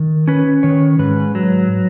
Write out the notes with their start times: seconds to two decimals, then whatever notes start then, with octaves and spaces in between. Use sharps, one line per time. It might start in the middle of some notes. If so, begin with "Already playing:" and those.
Already playing: D#3
0.28 C#4 B4
0.63 D#3 C#5
0.99 G#2 B4
1.35 F#3